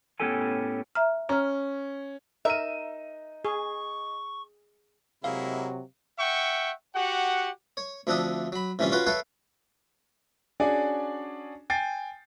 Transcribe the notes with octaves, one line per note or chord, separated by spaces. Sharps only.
A2 B3 C#4 G4 A4 G#5
E5 A#5 F6
C#4 A#5 F6
D#4 A#4 E5 D#7
G#4 C#6
C3 F#3 G#3 A#3 E4 F5
E5 F#5 G5 C#6
F#4 G4 F#5
C#5
D2 F3 C4 D4 E5 D#6
F#3 B5
A2 C3 E3 G3 C#4 F4
C#4 F4 F#4 B4 F5 G5
A4 B4 C#5 E5 F5 G5
C#4 D4 F#4 G#4 D5 G#5
G5 G#5 A6 C7